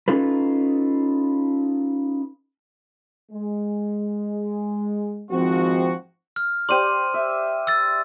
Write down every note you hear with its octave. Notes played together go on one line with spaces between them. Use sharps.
C#4 D#4 F4 A4 B4
G#3
G#2 D#3 F3 C4 F#4
F6
G4 C5 D5 C6 D#7
E5
E6 A6